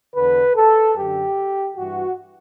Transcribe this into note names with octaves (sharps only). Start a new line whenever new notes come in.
E2 D3 B4
A4
F#2 D3 G4
G2 E3 F#4